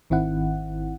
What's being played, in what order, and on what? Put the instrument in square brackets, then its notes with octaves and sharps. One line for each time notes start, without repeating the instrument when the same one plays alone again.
[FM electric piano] G#1 D#3 C4 E4 F#5